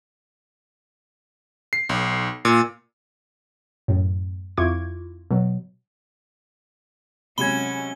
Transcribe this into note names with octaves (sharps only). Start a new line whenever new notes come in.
C7
B1
A#2
F#2 A2
F2 E4 F4 C#6 D6 G#6
B2 F#3
C3 F#3 G#3 C#4 F#4 B5 G#6 G7